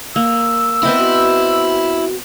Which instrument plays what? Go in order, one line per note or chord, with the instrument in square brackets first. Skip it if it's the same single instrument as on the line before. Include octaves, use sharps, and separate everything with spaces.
[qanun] A#3 [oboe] E6
[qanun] B3 C4 D#5 [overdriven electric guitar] E4
[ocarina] F#4